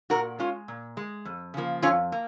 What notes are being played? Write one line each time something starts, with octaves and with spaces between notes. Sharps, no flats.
A#2 F#4 A#4
G#3 C#4 F4
A#2
G#3
F2
C#3 F3 A#3
F2 C#4 F4
A#3